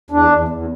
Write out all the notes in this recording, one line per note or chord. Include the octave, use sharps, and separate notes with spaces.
E2 D4
E2
E2